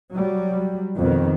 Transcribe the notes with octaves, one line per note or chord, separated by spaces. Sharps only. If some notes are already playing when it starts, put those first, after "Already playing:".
F#3 G3
F2 B2 D#3